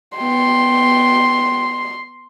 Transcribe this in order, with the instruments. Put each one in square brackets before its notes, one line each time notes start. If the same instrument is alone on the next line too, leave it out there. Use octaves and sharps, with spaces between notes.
[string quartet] B3 G5 [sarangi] C6